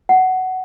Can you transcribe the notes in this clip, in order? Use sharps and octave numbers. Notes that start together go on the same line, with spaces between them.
F#5